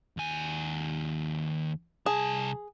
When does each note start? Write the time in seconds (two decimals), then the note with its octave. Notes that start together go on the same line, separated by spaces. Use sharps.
0.17 D#2 G#5
2.06 C2 G#4 A5